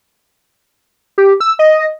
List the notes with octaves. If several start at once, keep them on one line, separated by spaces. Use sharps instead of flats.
G4
E6
D#5